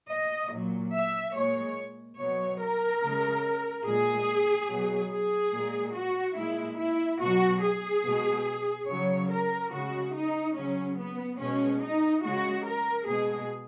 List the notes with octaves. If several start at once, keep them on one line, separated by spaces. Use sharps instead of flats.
D#5
A#2 F#3
E5
A#2 G#3 C#5
B2 F#3 C#5
A#4
C#3 G#3
A#2 G#3 G#4
B2 F#3
G#4
A#2 G#3
F#4
A#2 G#3 E4
E4
B2 F#3 F#4
G#4
B2 G#3
C#3 F#3 C#5
A#4
C#3 G#3 F#4
D#4
C#3 F#3 C#4
B3
B2 G#3 C#4
D#4
C#3 G#3 F#4
A#4
B2 G#3 G#4